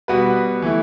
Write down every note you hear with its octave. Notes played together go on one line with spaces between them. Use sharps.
B2 G3 B3 F#4 B4
E3 A3 E4